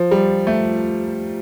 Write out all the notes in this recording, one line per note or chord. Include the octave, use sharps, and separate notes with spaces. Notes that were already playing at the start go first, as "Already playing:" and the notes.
Already playing: F3
G3
A3